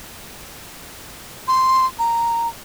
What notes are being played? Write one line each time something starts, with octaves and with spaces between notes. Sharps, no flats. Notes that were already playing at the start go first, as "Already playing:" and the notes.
C6
A#5